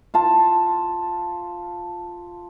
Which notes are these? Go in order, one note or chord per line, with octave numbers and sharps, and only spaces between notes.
F4 A5